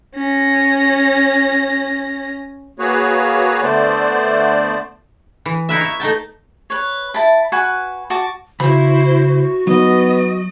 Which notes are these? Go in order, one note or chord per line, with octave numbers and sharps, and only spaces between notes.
C#4 A#6
A#3 F#4 G#4 B4 C#5
D3 A3 B3 C5 D5
E3
D#4 E4 B4 E5
C#5 E5
A3 D#4 G5 A5
B4 C#5
E4 A5 B5
F#4 B4 G#5 B5
F#4 A5 D6
C#3 E4 F#4 C5 B5
F#3 B3 D#4 D#5